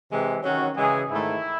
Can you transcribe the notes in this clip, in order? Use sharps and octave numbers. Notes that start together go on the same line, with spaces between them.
C3 E3 G#3
D#3 F#3 C#4 F#4
C#3 E3 G#3 G#4
G#2 D#3 A3 D#4 E4